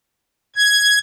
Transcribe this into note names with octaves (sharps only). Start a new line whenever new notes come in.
G#6